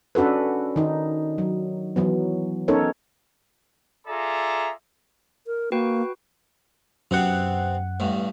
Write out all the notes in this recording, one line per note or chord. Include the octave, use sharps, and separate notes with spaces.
C#4 D4 F#4 A4 B4
D#3 D#4
F#3
E3 F#3 B3
B3 C#4 D#4 A4 A#4 C#5
F4 G#4 A4 D5 E5 A#5
A#4
A#3 F#4 B4 G5
F#2 C3 B3 C4 F#5
A1 G2